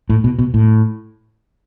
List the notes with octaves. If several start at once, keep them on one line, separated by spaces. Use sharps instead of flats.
A2
B2
B2
A2